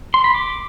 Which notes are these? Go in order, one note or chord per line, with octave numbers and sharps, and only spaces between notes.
C6
B5
D6